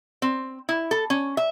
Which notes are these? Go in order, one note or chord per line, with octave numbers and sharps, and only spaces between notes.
C4
E4
A4
C#4
E5